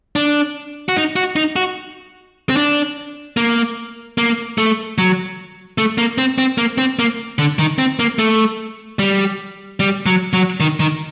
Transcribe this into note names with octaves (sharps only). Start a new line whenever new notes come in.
D4
F#4
D#4
F#4
D#4
F#4
C4
D4
A#3
A#3
A3
F#3
A3
A#3
C4
C4
A#3
C4
A#3
D3
D#3
C4
A#3
A3
G3
G3
F#3
F#3
D#3
D#3